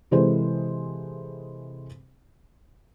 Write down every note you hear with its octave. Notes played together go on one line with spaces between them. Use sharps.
C3 E3 G#3 G#4 A4 C5